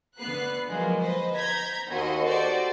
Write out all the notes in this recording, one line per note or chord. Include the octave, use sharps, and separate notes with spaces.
D3 B3 B4 F#6 C7
F3 F#3 G#3 A#3 F4
B4 C5 D#5
A#5 G6 G#6 A#6 B6
D#2 F#4 D#5 C6
F#4 G4 A4 C5 D5